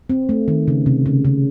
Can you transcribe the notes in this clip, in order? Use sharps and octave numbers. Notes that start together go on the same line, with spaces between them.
C4
A3
D#3
C#3
C3
C#3
C#3